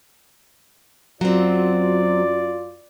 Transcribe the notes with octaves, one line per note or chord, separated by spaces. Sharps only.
F#2 F#3 C4 F4 D5